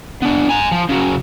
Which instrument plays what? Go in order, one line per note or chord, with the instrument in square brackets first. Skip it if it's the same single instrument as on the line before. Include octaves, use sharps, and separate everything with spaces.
[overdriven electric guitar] B3 D4
G#5 A#5
F3
C#3 F#3